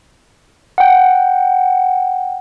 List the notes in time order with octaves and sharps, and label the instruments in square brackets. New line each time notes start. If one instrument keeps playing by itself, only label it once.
[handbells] F#5 G5